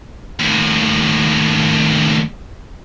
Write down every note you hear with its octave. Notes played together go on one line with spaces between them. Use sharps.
D#2 A2